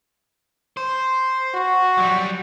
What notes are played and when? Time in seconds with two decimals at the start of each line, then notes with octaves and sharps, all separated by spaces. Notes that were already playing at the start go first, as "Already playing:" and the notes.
0.77 C5
1.54 F#4
1.98 F#3 G3